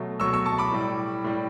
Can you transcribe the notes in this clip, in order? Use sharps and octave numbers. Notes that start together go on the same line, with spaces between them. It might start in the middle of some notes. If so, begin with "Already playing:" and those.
Already playing: B2 F#3 A3
B2 F#3 A3 C#6 E6
C#6 E6
A5 C#6
B5 D6
A2 G3
A2 G3